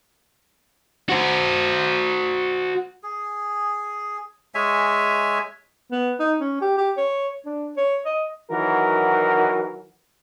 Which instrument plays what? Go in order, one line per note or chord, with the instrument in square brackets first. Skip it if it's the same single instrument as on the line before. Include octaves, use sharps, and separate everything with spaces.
[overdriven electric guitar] F#4 C5
[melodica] G#4
G#3 C#5 E5 G#5
[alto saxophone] B3
D#4
C#4
G4
G4
C#5
D4
C#5
D#5
[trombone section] D#3 E3 F#3 F#4 A#4